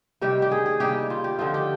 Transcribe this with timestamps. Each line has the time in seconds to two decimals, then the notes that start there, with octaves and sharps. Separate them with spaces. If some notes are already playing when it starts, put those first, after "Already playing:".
0.21 C3 D#3 G3 G4
0.42 G4
0.51 G#4
0.66 G#4
0.80 C3 G3 A#3 D#4 G4
1.10 F4
1.24 G4
1.39 D3 F3 C4 D#4 F4
1.54 G4